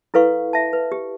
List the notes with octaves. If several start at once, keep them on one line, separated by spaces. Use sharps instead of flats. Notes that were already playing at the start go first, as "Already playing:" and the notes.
E4 A4 B4 F5 C#6
E5 A5
B4
G4